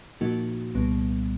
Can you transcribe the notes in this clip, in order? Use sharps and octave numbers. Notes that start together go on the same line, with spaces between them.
A#2 F3 A#3 D#4 F#4
C2 A#2 G3 B3